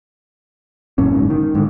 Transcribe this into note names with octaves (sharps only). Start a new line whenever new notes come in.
F#2 A#2 C#4
F#1 G#2
D#3
G#2 D3